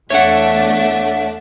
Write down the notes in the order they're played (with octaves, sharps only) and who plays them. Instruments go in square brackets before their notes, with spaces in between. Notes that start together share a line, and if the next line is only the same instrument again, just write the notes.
[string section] E2 A3 D4 [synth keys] C#5 F#5 [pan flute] E5